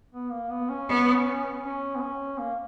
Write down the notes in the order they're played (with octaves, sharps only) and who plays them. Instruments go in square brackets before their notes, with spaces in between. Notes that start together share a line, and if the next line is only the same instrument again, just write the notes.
[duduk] B3
A#3
B3
C#4
[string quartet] B3
[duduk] C#4
B3
C#4
A#3